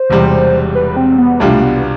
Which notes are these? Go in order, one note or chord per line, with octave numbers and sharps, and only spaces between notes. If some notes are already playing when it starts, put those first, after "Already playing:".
Already playing: C5
E1 E2 C3 G3
B4
C4
B3
C2 B2 G3 A3 D4 F4
B3